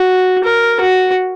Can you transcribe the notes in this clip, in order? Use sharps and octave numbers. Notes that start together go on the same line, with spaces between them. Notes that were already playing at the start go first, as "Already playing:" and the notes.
Already playing: F#4
A#4
F#4